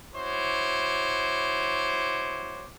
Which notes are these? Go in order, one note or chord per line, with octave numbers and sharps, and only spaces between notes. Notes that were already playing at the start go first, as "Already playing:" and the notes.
E4 F#4 C5 C#5 D6